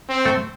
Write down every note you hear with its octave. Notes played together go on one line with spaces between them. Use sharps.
C4
A3 A4